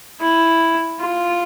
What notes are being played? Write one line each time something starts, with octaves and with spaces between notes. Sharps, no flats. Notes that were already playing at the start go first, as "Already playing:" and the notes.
E4
F4